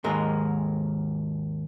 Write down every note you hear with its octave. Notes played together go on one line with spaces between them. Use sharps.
D#2 G#2 G#3 A#4